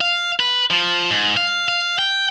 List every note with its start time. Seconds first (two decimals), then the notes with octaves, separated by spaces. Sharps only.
0.01 F5
0.40 B4
0.70 F3
1.11 G#2
1.37 F5
1.68 F5
1.99 G5